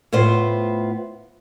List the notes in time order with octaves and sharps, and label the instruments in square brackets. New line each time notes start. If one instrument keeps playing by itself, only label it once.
[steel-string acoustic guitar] A2 B3 F4 C5